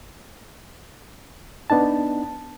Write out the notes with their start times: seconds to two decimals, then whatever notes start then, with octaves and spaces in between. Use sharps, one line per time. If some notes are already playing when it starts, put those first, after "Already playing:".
1.70 B3 D4 D#4 A5